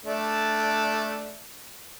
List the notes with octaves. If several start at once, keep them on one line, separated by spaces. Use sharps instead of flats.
A3 D4